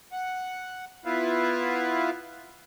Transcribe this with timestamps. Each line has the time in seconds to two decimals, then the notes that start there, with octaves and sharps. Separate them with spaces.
0.12 F#5
1.05 B3 E4 F4 B4 E5 F5